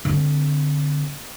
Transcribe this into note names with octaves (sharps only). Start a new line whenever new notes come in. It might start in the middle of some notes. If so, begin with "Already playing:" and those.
D3 C4